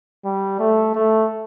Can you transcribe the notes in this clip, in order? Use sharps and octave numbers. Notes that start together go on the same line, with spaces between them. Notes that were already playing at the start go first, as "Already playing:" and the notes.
G3
A3
A3